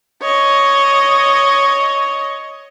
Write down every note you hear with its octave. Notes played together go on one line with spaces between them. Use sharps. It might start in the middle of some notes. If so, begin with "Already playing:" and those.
C#5 D#5